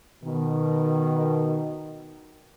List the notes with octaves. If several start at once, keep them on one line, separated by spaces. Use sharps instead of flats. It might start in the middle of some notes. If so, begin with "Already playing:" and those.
B2 D#3